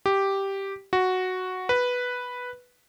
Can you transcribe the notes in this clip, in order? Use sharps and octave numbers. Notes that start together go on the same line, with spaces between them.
G4
F#4
B4